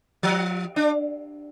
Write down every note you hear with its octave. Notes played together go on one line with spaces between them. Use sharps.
F3
D4